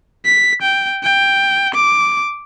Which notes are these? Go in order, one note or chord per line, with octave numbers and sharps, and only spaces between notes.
B6
G5
G5
D6